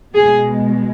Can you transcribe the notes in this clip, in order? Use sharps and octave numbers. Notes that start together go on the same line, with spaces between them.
B2 G#3 G#4